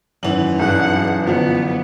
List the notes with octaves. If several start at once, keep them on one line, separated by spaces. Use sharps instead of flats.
G#1 F#2 E3 F#7
B1 G2 G#4 F#5 F#6
G1 F3 B3